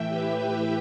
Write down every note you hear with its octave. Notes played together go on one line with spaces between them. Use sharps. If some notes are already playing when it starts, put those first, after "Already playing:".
Already playing: A2 E3 E5 G5
G4 B4
G4 B4